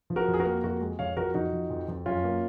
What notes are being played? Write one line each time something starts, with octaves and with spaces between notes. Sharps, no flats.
F3
F#4 A#4
F2
G#4
F#4 A#4
A#3
F2 F#4 A#4
G#3
F2 C#5 F5
F3 F#4 A#4
F2 D#4 F#4
F3
F2
F2
F#2 C#4 F4
A#3